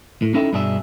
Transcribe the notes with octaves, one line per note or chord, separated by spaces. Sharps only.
A2
C#4 D#4 E4 A4 E5 G5
G2 B2 D4 G#4 A#4 E5